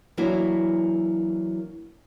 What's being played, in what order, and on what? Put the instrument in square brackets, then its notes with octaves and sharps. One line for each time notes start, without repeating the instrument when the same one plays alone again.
[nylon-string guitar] E3 F#3 A#3 D4 E4 F#4